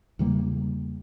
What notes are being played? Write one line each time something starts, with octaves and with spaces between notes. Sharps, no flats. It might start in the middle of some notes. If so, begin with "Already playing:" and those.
E2 C#3 G3 A#3